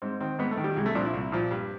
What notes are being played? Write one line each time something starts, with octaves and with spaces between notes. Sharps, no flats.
G#2 C4
D#3 C4
G#2 B3
A3
D#3
G3
C2 G#3
A3
A#2 F3 D4
E4
C2
A#2 F3
G2